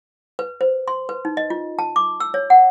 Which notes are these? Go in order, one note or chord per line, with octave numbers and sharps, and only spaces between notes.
B4
C5
C6
B4
D#4
D#5
F4
A5
D6
E6
C#5
F#5